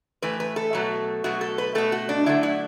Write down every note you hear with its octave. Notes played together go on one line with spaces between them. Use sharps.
A2 E3 A3 B4
B4
A4
B2 F#3 A3
B2 F#3 A3 F#4
A4
B4
B2 A3 A4
F#4
D4
D3 F#3 A3 E4
E4